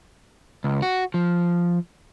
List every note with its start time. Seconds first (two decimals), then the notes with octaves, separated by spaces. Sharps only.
0.64 C#2
0.82 F#4
1.14 F3